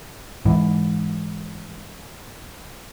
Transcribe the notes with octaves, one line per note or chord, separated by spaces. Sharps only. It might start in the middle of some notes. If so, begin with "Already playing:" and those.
G#2 E3